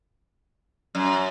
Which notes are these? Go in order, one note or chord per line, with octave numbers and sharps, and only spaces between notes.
F#2